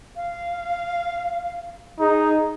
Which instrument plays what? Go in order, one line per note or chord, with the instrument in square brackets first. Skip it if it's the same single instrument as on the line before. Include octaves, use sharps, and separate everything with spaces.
[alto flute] F5
[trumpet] D#4 [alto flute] G#4